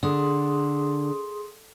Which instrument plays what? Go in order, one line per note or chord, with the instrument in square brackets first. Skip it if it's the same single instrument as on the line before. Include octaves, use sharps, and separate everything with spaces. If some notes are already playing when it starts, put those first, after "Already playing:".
[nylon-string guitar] D3 [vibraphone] G#4 C6 D#6